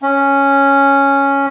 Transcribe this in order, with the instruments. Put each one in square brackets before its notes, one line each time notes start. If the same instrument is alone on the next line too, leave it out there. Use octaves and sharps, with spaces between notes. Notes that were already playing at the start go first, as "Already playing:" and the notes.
[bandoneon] C#4